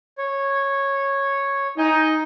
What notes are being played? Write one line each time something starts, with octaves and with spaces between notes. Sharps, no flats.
C#5
D#4 G#5